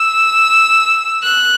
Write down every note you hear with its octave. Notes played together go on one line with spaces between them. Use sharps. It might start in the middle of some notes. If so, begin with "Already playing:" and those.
Already playing: E6
F#6